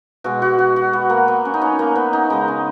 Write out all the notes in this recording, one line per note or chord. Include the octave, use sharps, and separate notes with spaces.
B2 G#3 F#4
F#4
F#4
F#4
B3
A#3
B3
C#4
D#4
C#4
A#3
B3
D#4
C#3 G#3 D#4
C#4